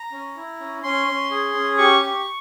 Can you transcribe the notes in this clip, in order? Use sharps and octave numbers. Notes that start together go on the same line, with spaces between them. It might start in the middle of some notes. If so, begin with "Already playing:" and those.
Already playing: A#5
C#4
E4
C#4
C#4 C6
C#4
G#4
C#4
G4 C#6
G4